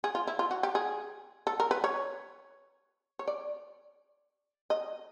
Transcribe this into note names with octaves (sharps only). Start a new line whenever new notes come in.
G#4
F4
E4
F4
F#4
G4
G#4
A4
A#4
B4
C#5
C#5
D5
D#5